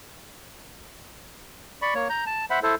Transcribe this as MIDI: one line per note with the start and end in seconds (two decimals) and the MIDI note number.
1.82 1.94 74
1.82 1.94 83
1.82 1.94 85
1.95 2.08 58
1.95 2.08 73
2.10 2.24 82
2.10 2.24 91
2.26 2.45 81
2.50 2.59 72
2.50 2.59 76
2.50 2.59 78
2.50 2.59 83
2.63 2.75 64
2.63 2.75 69
2.63 2.75 72